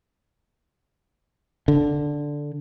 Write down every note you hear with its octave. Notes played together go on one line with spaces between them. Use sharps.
D3